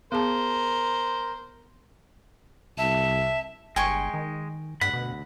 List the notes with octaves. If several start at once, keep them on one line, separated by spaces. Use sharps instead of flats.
B3 G#4 A#4 C5 A5
C2 E5 A5
G1 G#3 G5 G#5 C#6
D#3
D2 G2 F#5 B5
B2